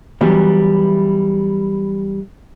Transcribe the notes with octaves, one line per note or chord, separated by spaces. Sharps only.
E3 F#3 G3 B3 E4 F#4